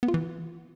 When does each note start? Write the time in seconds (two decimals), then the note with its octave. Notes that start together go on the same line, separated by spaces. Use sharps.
0.03 B3
0.08 F4
0.14 E3